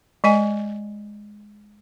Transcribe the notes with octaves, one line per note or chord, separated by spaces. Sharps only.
G#3 D#5 G#5